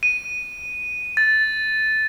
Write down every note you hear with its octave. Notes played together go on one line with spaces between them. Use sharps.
D#7
A6